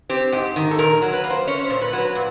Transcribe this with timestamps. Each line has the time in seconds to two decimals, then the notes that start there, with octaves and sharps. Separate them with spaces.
0.10 C4 G4
0.32 G#2 G4
0.56 D#3
0.71 A4
0.78 A#2 A#4
1.02 F#3
1.13 B4
1.24 A#3
1.30 C5
1.48 C#4 C#5
1.64 C5
1.70 A#2
1.81 B4
1.93 F#3
1.98 B4
2.15 A#2